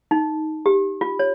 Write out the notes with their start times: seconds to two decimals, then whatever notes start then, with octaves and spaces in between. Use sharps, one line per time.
0.11 D#4
0.66 G4
1.01 F4
1.19 C#5